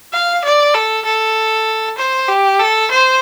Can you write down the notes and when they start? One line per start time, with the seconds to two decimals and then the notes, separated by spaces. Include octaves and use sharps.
0.13 F5
0.45 D5
0.75 A4
1.05 A4
1.98 C5
2.29 G4
2.60 A4
2.91 C5